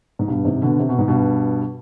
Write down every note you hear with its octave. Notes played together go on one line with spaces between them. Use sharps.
G#2
G2 B2
G#2 C3
B2 D3
C3
B2
G#2
G2 B2